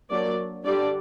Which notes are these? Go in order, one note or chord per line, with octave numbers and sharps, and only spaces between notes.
F#3 A#3 D4 D5
D3 G3 D4 D5